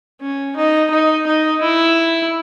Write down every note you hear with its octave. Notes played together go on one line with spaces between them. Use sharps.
C#4
D#4
D#4
D#4
E4